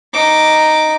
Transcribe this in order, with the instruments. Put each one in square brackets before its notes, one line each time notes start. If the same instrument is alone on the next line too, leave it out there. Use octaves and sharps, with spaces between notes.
[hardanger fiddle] D#4 D6